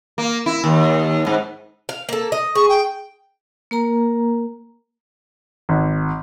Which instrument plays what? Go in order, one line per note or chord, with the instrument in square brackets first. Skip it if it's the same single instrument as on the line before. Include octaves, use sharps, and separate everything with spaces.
[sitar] A#3
E4
D#2
G#2
[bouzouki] F5
A#3 A4
D#5
[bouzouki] G#4 [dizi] C#6
[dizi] G5
[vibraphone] A#3 A#4 A#5
[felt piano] G#1